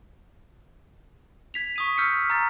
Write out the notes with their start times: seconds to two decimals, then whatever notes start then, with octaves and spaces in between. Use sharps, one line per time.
1.54 G#6 B6 F7
1.76 C#6 D#6 D#7
1.97 E6 F6 G6 B6 C#7
2.30 A#5 F6 A6